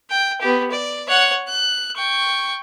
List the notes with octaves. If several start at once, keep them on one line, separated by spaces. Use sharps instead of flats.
G5
B3 G4
D5
C#5 F#5
F#6
G5 C#6